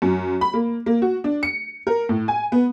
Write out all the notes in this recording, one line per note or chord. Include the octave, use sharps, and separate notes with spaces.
F#2
B5
A#3
A#3
F#4
D4
C#7
A#4
A2
G#5
B3